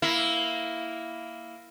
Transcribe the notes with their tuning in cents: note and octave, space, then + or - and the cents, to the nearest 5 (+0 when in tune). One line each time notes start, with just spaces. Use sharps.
A#3 +0 E4 +0